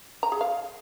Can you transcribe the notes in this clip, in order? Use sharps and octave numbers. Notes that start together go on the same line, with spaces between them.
A#5
G#4
F5